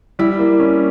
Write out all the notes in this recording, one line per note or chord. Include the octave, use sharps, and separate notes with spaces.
G3 E4
A#3
C#4